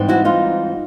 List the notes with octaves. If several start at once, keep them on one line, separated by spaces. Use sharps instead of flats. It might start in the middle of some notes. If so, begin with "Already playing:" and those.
Already playing: G#2 E3 G3 C4
E4 F#4
D#4 F4